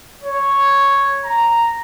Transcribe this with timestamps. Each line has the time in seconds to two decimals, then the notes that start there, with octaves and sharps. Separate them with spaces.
0.24 C#5
1.25 A#5